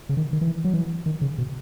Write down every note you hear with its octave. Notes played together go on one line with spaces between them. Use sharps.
C#3
D#3
D#3
E3
F#3
E3
D#3
C#3
B2